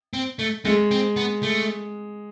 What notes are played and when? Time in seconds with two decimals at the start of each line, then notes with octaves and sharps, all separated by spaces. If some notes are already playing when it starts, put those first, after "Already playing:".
0.13 C4
0.39 A3
0.65 G#3 A3
0.91 C4
1.16 B3
1.43 A3